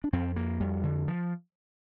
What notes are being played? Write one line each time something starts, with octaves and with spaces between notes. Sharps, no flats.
D4
F2 C4
A#3
F2 G3
D3
F3